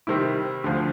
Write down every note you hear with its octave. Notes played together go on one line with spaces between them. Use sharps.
C3 D#3 G3 C4 E4
D2 D3 F3